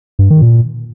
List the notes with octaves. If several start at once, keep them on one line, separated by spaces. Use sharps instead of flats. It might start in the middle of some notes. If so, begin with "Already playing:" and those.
G2
D#3
A#2